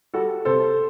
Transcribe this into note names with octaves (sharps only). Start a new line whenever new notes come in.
G3 F#4 A4
C3 A4 C5